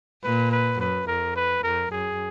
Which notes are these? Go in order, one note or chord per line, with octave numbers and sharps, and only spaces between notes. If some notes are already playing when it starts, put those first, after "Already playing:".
A#2 B4
B4
F#2 B4
F2 A#4
B4
F2 A#4
F#2 G#4